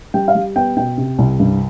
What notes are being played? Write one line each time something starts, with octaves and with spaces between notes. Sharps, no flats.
G3 G5
F5
G3
B3 G5
B2 G5
C3
C2
G2